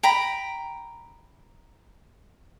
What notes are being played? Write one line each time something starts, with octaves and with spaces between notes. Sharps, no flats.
G5 A#5 B5